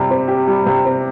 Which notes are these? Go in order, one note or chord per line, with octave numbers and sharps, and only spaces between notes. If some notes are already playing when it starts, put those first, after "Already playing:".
Already playing: C3 G3
C4
G4
G3
C3
C4